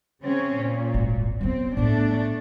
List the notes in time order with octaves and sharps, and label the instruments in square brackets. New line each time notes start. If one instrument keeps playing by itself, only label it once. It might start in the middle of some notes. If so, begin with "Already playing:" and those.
[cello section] C#3 C4 C#4
A#2
[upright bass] D#1 G#1
[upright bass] F#3 B3 [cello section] C4
[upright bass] A2 B3 [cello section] A3 D4